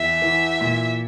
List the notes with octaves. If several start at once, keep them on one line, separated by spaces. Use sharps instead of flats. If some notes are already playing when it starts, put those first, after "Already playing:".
Already playing: E2 E5
E3
A#2